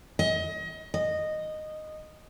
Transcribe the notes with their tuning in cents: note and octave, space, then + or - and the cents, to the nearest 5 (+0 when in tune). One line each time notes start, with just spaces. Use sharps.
D#5 +30
D#5 -10